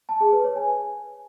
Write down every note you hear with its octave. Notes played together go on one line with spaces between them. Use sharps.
A5
G#4
B4
C#5
G#5